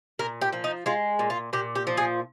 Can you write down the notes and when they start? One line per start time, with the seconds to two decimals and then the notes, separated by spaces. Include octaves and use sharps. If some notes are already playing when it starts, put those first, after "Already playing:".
0.19 A#2 A#4
0.41 G4
0.53 F3
0.64 D#4
0.86 G#3 F4
1.19 A#2
1.30 F4
1.53 A#2 G4
1.75 G4
1.87 F3
1.97 G#4